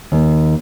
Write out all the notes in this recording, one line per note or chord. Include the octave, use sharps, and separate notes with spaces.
D#2